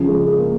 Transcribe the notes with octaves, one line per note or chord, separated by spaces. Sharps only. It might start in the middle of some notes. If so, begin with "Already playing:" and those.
Already playing: C#3 F3
G#3
G#3
A#3